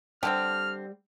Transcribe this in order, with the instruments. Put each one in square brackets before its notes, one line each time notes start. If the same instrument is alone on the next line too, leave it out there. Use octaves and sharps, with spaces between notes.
[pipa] D3 C4 [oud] G3 G4 [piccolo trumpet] F6